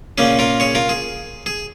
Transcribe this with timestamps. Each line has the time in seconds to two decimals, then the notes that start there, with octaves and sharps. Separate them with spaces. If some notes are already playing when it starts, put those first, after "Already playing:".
0.18 A#2 A#3 C#4 G#4
0.39 F4 A#4
0.60 G#4 C#5
0.75 F4 A#4
0.89 G#4
1.46 G#4